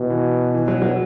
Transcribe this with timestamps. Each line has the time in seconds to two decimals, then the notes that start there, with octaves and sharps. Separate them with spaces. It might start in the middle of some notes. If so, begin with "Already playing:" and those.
Already playing: B2 E3
0.10 E3
0.54 E3
0.68 F#3
0.82 F#3